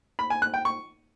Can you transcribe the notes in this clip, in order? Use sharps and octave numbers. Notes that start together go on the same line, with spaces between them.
B5
G#5
F#6
G5
C#6